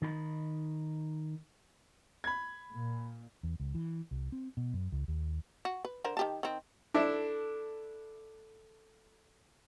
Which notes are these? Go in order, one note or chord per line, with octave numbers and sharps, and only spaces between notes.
D#3 D#4 B5
B5 G#6
A#2
E2
C#2
E3
C2
C4
B2
F#2
C#2
D#2
F#4
B4
D3 A#4 C5
D#3 G4 A5
D#3 C4
D4 E4 A4